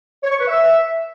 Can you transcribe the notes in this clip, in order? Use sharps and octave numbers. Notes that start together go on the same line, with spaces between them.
C#5
C#6
B4
E5